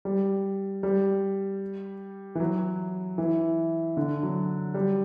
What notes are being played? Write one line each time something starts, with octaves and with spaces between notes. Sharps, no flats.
G3
G3
E3
F#3
E3
D3
F#3
G3